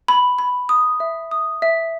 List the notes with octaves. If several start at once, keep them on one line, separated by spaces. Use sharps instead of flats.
B5
B5
D#6
E5
D#6
E5